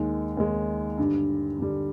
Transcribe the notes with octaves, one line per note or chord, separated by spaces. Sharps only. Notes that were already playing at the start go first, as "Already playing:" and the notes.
Already playing: D#2 D#3 G#3
D#2 D#3 G#3
G2 D3 G3
G2 D3 G3